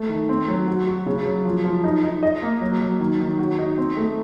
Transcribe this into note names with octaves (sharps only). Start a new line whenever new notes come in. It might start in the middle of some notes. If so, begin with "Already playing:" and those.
Already playing: A3
D#3
C4
F#3
F#4
F#4
C#3
F#3
F3
F3
D#4
D#4
D#5
A#3
F#3
F#3
D#3
D#3
F#4
D#4
C4
A3